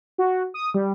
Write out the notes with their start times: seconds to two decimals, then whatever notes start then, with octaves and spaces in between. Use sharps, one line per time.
0.18 F#4
0.54 D#6
0.74 G3